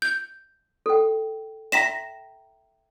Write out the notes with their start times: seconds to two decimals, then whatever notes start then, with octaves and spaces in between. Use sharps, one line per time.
0.02 G6
0.86 A4 G5
1.72 E5 G5 A#5 A#6 B6 E7